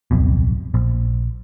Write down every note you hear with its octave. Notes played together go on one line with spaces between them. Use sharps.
D1 B1 F2 B2
A#1